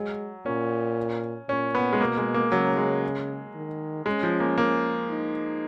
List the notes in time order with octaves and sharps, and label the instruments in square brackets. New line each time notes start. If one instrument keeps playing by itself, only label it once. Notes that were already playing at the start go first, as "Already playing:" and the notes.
Already playing: [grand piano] F#3 [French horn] G#3
[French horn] A#2 [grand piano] C#4
[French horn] A#2 [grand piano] C#4
[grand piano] B3
G#3
[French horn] B2 [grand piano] A#3
[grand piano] G#3
A#3
[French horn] C#3 [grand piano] F#3
[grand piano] G#3
[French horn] D#3
[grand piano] G#3 [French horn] C#4
[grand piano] F3
A#3
A#3
[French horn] D#4